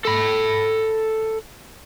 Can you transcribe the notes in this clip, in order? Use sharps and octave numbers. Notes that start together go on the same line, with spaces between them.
A4 B5